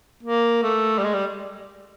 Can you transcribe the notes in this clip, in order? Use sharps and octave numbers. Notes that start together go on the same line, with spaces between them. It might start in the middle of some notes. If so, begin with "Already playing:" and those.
A#3
A3
G3
G#3
G3